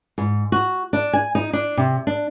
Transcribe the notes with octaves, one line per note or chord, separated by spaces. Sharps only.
G#2
F#4
D4
G#5
D#4
D4
C3
D4